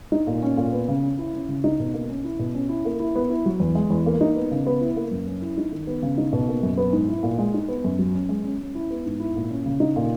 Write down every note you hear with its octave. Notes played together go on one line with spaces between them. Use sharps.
D#4
A#2
C#4
A#2
B3
C#3
C#4
E4
C#4
C#3
D#4
B2
A#3
C#4
E4
B2
C#4
E4
A#3
E4
B3
E4
F#3
E2
G#3
E2
A#3
D#4
B3
C#3
B3
E4
A#3
F#2
C#4
E4
D#4
D#3
B3
C#3
D#4
B2
A#3
F#2
B3
G#2
E4
A#2
G#3
D#4
B3
F#2
F#3
C#4
G#3
C#4
C#4
E4
B3
G#2
E4
A#2
C#4
C#3
D#4
A#2